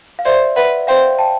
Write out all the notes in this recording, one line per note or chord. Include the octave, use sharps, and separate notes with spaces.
F5
C5 D5 E5
B4 E5 F#5
C5 F5 G5
G5 A5